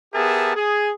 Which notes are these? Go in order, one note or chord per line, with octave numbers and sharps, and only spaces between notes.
B3 G4 G#4 A#4 E5 A5
G#4